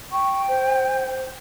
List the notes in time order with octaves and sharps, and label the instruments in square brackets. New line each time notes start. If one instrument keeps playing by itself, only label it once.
[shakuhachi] G5 [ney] C#6
[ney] C5